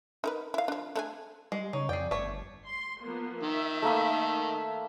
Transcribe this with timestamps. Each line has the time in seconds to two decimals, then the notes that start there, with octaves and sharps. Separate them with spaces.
0.24 D#4 A#4 B4
0.54 E4 F5
0.68 F3 D4
0.96 A3 D4 G#4
1.52 G3 G#3
1.73 C#3 D#4 C#5
1.89 F2 G#4 D5 G5
2.11 G1 A3 C#5
2.67 C6
3.02 F3 A#3 B3
3.43 D#3 E5
3.82 A3 A#3 B5